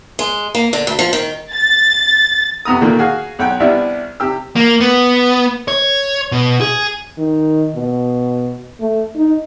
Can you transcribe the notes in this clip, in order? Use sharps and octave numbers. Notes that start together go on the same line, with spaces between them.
G#3
A#3
D3
D2
F3
D#3
A6
F2 C3 B3 A#5 D#6
A#2 D3 D#3 A3 A#3
F#4 G#4 F5
B1 F#5 G5
C2 G3 B3 D4 E4 E5
C3 G4 E6
A#3
B3
C#5
B2
G#4
D#3
B2
A3
D#4